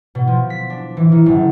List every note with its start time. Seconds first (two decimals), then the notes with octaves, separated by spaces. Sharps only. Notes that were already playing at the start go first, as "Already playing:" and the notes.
0.15 B2
0.27 F3
0.50 B6
0.70 D4
0.97 E3
1.12 D#3
1.26 F#1